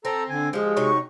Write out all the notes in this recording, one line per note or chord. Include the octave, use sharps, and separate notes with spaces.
C4 A4 A#5
D3 G#5
F3 G#3 G4
C3 F#3 D#4 C#6